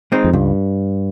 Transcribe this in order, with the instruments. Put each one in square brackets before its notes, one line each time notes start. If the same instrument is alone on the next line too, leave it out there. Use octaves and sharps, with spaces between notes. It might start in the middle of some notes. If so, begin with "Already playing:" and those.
[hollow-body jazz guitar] G#3 C4 D#4
[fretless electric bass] F2
[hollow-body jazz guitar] C#2 [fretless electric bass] G2